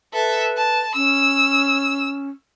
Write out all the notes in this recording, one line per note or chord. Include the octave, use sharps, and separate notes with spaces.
A4 B4 E5
A5
C#4 E6